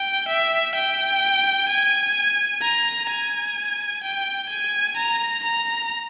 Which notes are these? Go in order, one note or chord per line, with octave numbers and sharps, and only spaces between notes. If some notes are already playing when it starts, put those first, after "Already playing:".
Already playing: G5
E5
G5
G#5
A#5
G#5
G5
G#5
A#5
A#5